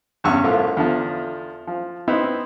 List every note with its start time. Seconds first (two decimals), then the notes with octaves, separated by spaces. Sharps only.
0.24 E2 G2 C#3 F#5 C#6 E6
0.44 C2 A2 A3 F4
0.77 E2 D3 F3
1.67 F3
2.08 B3 C4 D#4 E4